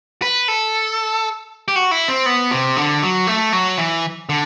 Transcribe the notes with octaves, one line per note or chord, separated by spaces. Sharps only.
B4
A4
G4
F#4
E4
C4
B3
C3
D3
F#3
A3
F#3
E3
D3